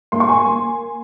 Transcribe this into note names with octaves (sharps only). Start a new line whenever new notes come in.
A#3 C6
C#6
G#5 C6
A#3